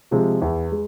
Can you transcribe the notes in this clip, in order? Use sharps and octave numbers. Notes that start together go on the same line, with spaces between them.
C3 F3 G#3
E2
G#3